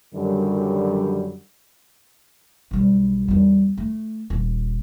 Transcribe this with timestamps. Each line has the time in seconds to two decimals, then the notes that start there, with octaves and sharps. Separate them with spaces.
0.14 F#2 D3 D#3 F#3 G3
2.71 B1 G3
3.28 E2 G3
3.77 A3
4.30 D#1